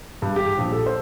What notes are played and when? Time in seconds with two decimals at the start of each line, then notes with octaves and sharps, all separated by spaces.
0.22 G2
0.36 G4
0.58 A#1
0.72 A4
0.86 C5